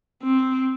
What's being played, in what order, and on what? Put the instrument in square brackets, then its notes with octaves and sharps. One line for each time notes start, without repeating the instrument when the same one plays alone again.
[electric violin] C4